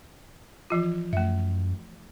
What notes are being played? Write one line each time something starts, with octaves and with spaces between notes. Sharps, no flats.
E3 F3 F4
F#2 A3 E5